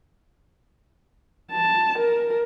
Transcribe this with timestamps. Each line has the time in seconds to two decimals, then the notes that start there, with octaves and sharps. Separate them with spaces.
1.52 A5
1.99 A#4